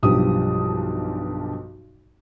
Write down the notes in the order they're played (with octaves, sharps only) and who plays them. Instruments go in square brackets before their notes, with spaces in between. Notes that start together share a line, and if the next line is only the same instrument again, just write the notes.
[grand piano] B1 G2 F3 G4 D#6